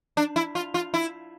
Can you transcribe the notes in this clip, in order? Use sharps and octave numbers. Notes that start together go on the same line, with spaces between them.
D4
E4
F4
F4
E4